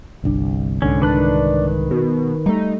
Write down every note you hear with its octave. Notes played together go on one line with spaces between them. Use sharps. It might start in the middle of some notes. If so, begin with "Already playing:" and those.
G1 C2 D4
C2 G#2 D3 C#4
D#3 D4 B4 F#6
B2
G3 A3 D#4